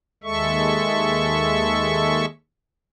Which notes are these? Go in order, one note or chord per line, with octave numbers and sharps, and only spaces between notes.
D#2 G#3 A4 E5 C#6